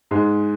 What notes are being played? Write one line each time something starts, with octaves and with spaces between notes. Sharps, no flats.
G#2 G#3